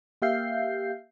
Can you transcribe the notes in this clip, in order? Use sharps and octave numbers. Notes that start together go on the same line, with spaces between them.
A#3 G4 E5 F5 G6 C7